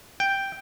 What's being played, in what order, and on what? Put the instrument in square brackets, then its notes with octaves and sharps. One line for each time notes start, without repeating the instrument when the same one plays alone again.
[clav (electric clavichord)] G5